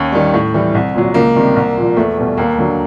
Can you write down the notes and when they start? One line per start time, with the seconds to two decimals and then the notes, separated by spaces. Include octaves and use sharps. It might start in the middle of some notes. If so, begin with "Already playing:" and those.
Already playing: D#2 C#4
0.12 D#3 G3
0.34 A2
0.54 E3 G3
0.75 C2
0.94 A#2 F#3
1.14 C#2 A#3
1.36 C3 D#3 G3
1.56 C2
1.77 A#2 F3
1.96 E2 A3
2.18 B2 G3
2.37 D#2 A#3
2.59 D3 F#3